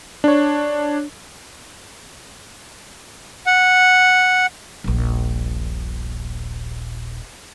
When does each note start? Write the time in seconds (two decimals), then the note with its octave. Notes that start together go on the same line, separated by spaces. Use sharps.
0.24 D4 C#5
3.46 F#5
4.84 D#1 A#1